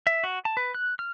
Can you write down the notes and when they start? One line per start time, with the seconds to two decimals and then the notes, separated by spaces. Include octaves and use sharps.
0.07 E5
0.24 F#4
0.45 A5
0.57 B4
0.75 F#6
0.99 F6